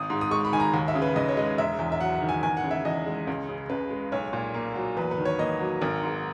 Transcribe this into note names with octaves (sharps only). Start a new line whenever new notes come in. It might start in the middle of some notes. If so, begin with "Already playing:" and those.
Already playing: G#1 D#6
G#2
D#6
G#3 C#6
B5
D#3 G#5
A#5
D#2
E5
C#3
B4
D#2 D#5
C#5
G#3 D#5
E1 E5
E2
E5
F#3 F#5
F#5
D#3
G#5
E2 G#5
F#5
C#3
E5
E2 D#5
G#3
C#2
C#3
C#2 B4
G#3
B1 C#5
A#2
A#3
F#3
E2 B4
B4
D#3
C#5
A#3 D#5
F#3
G#1 A#4
G#2